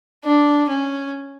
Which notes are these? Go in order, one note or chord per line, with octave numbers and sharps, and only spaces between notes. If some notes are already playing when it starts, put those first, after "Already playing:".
D4
C#4